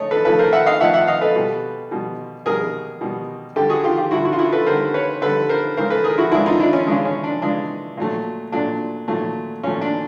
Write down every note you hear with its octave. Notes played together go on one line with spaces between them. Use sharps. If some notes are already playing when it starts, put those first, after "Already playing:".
Already playing: C#3 A3 C#5 D#5
A4 B4
C#3 F3 A3 A4 B4
A#4 C5
E5 F#5
D#5 F5
C#3 F3 A3 E5 F#5
E5 F#5
D#5 F5
A4 B4
B2 G3
B2 G3
B2 G3 G#4 A#4
B2 G3
D3 G3 G4 A4
F#4 G#4
F4 G4
F4 G4
D3 G3 E4 F#4
E4 F#4
F4
E4 F#4
A4 B4
D3 G3 A#4 C5
B4 C#5
D3 G3 A4 B4
A#4 C5
C#3 E3 G#3 A#4 C5
A4 B4
G#4 A#4
E4 F#4
C#3 E3 G#3 D4 E4
D#4 F4
D4 E4
C#4
C#3 E3 G#3 D4
C#4
D4
C#3 E3 G#3 D4
A#2 F#3 A3
A#2 F#3 A3 D4
A#2 F#3 A3
A#2 F#3 A3 C#4
D4